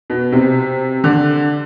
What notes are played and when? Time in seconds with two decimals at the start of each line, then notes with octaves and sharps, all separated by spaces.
0.10 B2
0.32 C3
1.04 D3